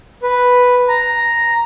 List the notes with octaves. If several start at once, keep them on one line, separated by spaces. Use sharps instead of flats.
B4
A#5